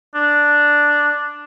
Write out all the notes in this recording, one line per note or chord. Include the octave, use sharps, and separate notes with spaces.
D4